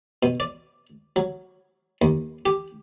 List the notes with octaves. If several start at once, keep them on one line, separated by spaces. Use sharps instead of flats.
B2
D5
F#3
D#2
G4